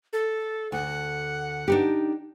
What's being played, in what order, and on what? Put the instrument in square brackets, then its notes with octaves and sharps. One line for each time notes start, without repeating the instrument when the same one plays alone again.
[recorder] A4
[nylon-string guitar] D2 [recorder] F#5
[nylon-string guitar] D4 D#4 G4